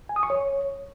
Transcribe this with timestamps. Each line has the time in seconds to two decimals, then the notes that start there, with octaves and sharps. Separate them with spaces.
0.09 G#5
0.16 D#6
0.23 C#6
0.30 C#5